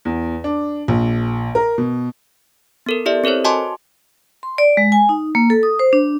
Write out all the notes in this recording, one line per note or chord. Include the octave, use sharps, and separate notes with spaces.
E2
D4
A#1
A#4
B2
B3 A4 A#4
E4 G4 D5 E5
C4 A4 A#4 C5 C#5
F#4 D#5 G#5 A5 C6 D6
C6
D5
G#3
G#5
D#4
A#3
A4
D#6
C5
D4